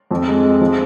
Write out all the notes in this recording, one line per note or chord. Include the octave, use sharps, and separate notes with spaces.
F2
G#3
G#3
F3